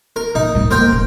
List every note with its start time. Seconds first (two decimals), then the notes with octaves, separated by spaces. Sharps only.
0.16 A#4
0.35 A#2 D#4
0.55 G#2 G#3
0.71 D#2 A#4 C5 G5
0.92 D#1